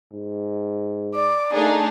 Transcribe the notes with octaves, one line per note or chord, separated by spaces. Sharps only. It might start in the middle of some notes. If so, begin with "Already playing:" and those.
G#2
D5 D6
A3 A#3 D4 D#4 G#4